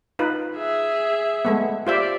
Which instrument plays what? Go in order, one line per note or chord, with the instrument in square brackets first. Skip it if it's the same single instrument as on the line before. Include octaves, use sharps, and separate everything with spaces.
[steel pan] D#4 F4 B4
[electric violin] G#4 E5
[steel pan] G#3 A3 B3
[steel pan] F4 C5 E5 [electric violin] G4 D5